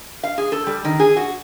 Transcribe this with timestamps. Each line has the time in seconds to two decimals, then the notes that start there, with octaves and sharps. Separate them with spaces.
0.23 F5
0.38 G#4
0.52 A4
0.67 G3
0.85 D#3
1.00 G#4
1.17 F#4